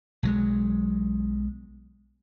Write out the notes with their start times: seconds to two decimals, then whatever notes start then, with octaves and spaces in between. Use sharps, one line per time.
0.23 B1 F#3 G#3